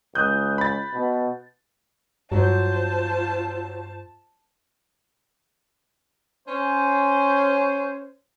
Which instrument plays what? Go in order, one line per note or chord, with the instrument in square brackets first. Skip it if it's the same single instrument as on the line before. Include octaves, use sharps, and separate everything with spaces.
[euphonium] C#2 [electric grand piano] D#6 F#6 G6
[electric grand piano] B5 A6
[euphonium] B2
[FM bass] G2 [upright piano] F#3 [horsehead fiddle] F4 C5 [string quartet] A5
[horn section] C#4 C5